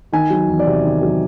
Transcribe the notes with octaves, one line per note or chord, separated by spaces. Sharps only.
D#3 G#5
F#3
E2
D5
C3
D#3
F#3